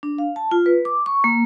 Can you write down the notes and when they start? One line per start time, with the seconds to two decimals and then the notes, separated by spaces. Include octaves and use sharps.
0.03 D4
0.18 F5
0.36 A5
0.51 F4
0.66 B4
0.85 D6
1.06 C#6
1.24 A#3